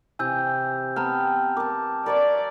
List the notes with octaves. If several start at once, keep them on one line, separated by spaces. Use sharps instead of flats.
C3 E3 G#5 E6 G6
B3 C4 G5 A5 A#5 F6
A#4 A5 D6
A#4 C#5 D5 E5